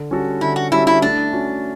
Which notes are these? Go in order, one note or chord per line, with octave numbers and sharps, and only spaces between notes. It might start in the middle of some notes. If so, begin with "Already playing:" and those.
Already playing: D3
G3 C#4 F#4 A4
D3 E4
F#4
G3 C#4 E4 F#4 A4
E4
A3 D4
C#4 F#4